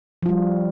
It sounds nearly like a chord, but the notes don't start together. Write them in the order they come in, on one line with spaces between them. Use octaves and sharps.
F3 F4 G3